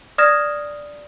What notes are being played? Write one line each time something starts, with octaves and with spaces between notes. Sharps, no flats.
D5 D#6 F6 G#6 A#6 E7